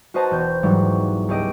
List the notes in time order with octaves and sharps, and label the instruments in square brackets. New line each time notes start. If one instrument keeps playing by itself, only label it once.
[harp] F#4 B4 C5 D#5 A5 A#5
E1 G6
G#2 E3 F#3 G3
C#2 G4 D#5 D7